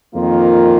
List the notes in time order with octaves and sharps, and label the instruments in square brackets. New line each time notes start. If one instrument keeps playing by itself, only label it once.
[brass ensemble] F2 D#3 A#3 F4